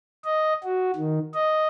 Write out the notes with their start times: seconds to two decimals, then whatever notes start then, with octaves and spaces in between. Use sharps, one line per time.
0.24 D#5
0.64 F#4
0.95 D#3
1.34 D#5